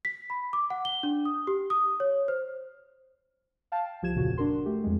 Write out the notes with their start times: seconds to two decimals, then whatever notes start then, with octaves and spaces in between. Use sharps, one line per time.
0.05 B6
0.30 B5
0.53 D6
0.70 F#5
0.85 G7
1.03 D4
1.25 D#6
1.47 G4
1.70 D#6
2.00 C#5
2.28 C5
3.72 F5 G5 A5
4.02 C#2 F3 G4 G#6 E7
4.15 G1 E2 A#2 C#3 F3 F#4
4.38 D4 F#4 A#4 C6
4.66 A3 G4
4.84 F2 G#3